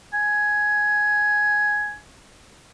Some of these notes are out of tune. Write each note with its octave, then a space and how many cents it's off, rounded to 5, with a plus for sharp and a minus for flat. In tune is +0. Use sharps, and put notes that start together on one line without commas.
G#5 +10